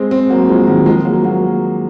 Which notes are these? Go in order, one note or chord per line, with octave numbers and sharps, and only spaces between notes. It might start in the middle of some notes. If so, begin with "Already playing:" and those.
Already playing: G#3 C4
G#3 C4
F#3 A#3
F3 G#3
D#3 F#3
F3 G#3
F#3 A#3
F#3 A#3